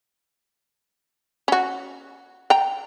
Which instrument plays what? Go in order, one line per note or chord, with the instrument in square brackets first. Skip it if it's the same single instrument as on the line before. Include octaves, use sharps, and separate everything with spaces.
[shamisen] C#4 F#4
G5 A#5